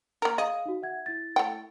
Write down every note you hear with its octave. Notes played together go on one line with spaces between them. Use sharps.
A#3 A#4
G#4 D#5 F5
D#4 F#4
E5 F#5 G#6
E4 A6
A3 F#5 G5